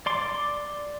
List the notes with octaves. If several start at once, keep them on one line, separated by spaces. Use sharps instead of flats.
D5 C6 D6